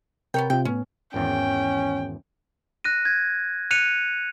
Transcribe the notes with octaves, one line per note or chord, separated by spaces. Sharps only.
C3 B3 A#4 C#5 G5
C3 F4 G5
A2 B3 C#4
G#1 E2 C#4 G5
F#6 A#6 D#7
G#6
F#6 C#7 D#7 F7